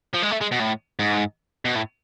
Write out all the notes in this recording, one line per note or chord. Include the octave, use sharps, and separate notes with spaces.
F3
G#3
A3
G#3
B2
A2
G#2
B2
A2